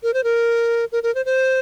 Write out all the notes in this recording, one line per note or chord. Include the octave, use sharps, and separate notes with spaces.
A#4
C5
A#4
A#4
A#4
C5
C5